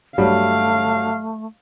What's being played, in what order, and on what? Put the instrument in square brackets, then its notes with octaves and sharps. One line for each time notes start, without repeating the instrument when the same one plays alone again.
[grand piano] G2 F#3 G3 [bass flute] A3 [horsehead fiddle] F5